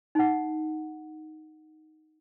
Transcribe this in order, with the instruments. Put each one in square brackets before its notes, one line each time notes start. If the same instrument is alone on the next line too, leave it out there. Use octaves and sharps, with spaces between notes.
[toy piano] D#4 F#5